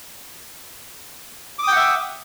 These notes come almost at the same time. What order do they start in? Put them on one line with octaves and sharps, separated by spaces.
D6 D#6 G5 F#5 E5